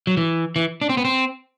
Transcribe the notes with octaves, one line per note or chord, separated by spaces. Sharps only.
F#3
E3
E3
D4
C4
B3
C4